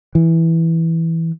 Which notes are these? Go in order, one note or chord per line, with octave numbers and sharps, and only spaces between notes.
E3